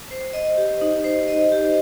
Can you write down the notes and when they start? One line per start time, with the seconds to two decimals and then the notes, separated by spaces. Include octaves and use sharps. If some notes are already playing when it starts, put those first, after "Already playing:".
0.11 C5
0.33 D#5
0.57 G4
0.81 D#4
1.04 C5
1.28 D#5
1.52 G4